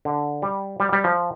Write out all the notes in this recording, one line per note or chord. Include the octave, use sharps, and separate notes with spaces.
D3
G3
G3
G3
F3